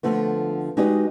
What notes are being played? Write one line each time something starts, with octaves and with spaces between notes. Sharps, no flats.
D3 F3 A3 B3
G#3 D#4 F#4 G4 B4 D#5